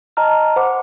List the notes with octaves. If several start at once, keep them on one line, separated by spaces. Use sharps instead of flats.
D#5 A5 A#5 F6
C5 F#5 B5 D6